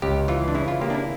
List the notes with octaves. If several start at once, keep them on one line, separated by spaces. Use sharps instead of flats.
C#2 G4
E3 F4
D4
C#3 E4
F4
A#3 G4
D4
E4